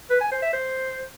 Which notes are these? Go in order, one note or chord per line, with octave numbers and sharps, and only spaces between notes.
B4
G#5
C5
E5
C5